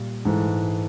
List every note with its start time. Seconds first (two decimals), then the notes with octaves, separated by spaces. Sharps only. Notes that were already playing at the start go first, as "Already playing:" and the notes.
Already playing: A#2 G3
0.25 G#2 E3 A3